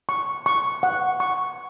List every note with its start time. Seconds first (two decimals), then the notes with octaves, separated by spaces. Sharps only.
0.09 C#6
0.46 C#6
0.83 F#5
1.20 C#6